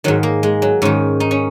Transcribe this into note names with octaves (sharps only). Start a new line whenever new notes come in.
G#2 D#3 F#3
A#3
G#3
F#3
G#2 D#3 C#4
D#4
C#4